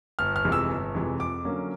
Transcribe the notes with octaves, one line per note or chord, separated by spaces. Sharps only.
G1 F6
F6
F2 C3 E3 G#3
E6
G1
F2 C3 E3 G#3
F2 D6
D3 F#3 A#3 C#4